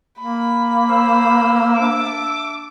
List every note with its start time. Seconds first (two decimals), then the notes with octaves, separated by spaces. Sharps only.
0.19 A#3 B5
0.89 C5 F5 E6
1.79 D4 E5 D6 E6